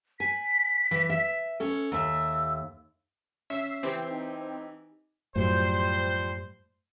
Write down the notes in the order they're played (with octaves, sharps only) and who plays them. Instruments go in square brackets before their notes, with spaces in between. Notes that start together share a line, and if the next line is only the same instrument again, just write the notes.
[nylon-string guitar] G#5 [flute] B6
[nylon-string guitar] E3
E5
C#4 A4
[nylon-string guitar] D#2 E5 [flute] E6
[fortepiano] C#4 [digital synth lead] E5 [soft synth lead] C7
[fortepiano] E3 G4 [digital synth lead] C4
[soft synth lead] D#4
[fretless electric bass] F#2 A2 [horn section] F3 G3 C5